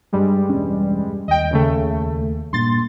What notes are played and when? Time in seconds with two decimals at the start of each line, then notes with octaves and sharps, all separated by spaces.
0.13 G2 G3 G#3
0.49 E1 C#4
1.28 D#2 D#5 G5
1.50 C#2 C#3 A3
2.53 G2 A#2 C6 A6